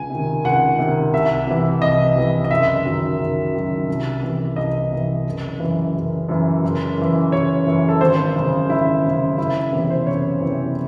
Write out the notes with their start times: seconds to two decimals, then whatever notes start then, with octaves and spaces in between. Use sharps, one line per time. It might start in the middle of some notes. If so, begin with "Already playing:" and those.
Already playing: C#2 G#5
0.10 C3 D#3
0.44 C#2 F#5
0.79 C3 D#3
1.13 C2 E5
1.47 C3 E3
1.82 C2 D#5
2.16 C3 E3
2.44 D#5
2.51 F#1 E5
2.85 F#2 D#3 F#3
3.19 F#1
3.53 F#2 D#3 F#3
3.88 C2
4.23 C3 E3
4.56 C2 D#5
4.91 C3 E3
5.26 F#1
5.60 F#2 E3
5.95 F#1
6.29 F#2 E3
6.64 F#1
6.98 F#2 E3
7.32 F#1 C#5
7.67 F#2 E3
7.89 A4
8.01 G#1 C5
8.35 F#2 C#3
8.69 G#1 E4
9.04 F#2 C#3
9.38 F#1 E4
9.72 E2 C3 E3
9.90 C5
10.07 F#1 C#5
10.41 E2 C3 E3